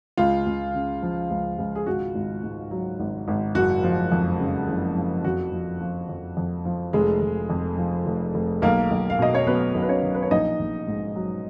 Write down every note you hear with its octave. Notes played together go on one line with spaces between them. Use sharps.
C#2 F4
C#2
C#3
F3
C#2
C#2
G#4
G#1 F#4
G#1
G#2
F#3
G#1
G#1
F#1 F#4
F3
F2
C#3
F#1
F3
F2 F#4
F3
F3
F2
F2
F3
F1 G#3 G#4
F1
F2
F3
F1
F1
B1 A#3 A#4
B1
F5
B2 D#5
C#5
F#3 B3 B4
B1
B4
C#4 C#5
B1
B4
C#5
A#1 D#4 D#5
A#1
G#2
F#3